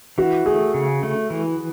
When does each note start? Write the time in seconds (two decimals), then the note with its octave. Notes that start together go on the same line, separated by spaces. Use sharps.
0.18 E3 F#4
0.46 A3 G#4
0.74 C#3
1.03 A3
1.30 E3